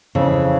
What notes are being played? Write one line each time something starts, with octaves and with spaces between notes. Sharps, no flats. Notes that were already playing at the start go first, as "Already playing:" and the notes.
F2 C#3 E3